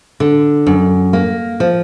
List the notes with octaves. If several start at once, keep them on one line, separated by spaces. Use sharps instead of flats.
D3
F#2
A#3
F3